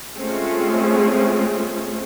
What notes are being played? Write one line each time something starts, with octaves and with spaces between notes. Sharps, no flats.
G#3 A3 C4 C#4 F4 G#4